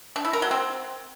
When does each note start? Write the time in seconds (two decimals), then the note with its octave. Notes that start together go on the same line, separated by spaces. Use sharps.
0.16 D4
0.25 E4
0.33 A#4
0.42 F#3
0.51 C4